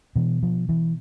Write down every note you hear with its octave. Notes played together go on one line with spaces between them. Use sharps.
B2 E3
F3
E3